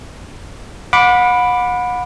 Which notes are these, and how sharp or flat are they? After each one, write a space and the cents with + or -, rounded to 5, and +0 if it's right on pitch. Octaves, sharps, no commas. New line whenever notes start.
F#5 -35 B5 +0 D6 +0